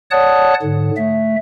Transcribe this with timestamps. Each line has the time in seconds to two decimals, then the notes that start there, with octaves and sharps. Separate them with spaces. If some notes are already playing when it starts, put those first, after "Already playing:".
0.11 C#5 D5 F#5 A5 D#6 F#6
0.62 G#2 D3
0.97 A3 E5